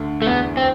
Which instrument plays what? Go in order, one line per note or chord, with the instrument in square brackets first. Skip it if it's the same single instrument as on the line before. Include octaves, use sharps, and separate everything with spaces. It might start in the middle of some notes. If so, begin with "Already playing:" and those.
Already playing: [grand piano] D2 D3
[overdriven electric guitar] A3
[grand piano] E2 E3 [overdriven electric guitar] B3
[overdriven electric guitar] C4